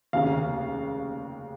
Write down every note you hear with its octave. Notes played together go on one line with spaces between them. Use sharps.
F1 D#2 C#3 F5